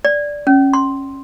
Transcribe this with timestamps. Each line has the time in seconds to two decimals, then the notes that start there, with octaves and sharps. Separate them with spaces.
0.05 D5
0.47 C#4
0.73 C6